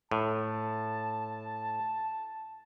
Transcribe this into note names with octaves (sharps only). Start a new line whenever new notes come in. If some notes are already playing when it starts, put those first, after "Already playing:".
A2 A5